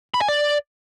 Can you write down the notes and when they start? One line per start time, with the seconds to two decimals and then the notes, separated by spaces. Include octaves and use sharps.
0.14 B5
0.21 G#5
0.28 D5